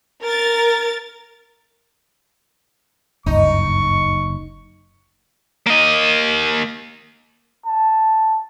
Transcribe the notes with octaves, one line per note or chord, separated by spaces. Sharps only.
A#4 A6
F#1 D2 G2 D#4 C#6
A#3 D#5
A5